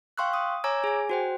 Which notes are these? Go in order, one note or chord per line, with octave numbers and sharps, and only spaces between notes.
F5 G5 C6 C#6 E6 F#6
D#6
C#5 G#5 A#5 D6 E6 G#6
G#4 G#5
F#4 C5 G5